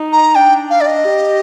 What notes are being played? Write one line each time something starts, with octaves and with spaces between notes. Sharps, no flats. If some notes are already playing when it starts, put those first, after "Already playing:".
Already playing: D#4
A#5
D4 G5
F5
D5
D#5
G4